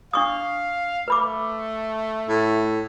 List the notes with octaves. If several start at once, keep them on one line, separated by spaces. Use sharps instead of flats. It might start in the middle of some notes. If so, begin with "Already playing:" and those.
D4 F5 C#6 D#6
A3 B4 B5 D6
A2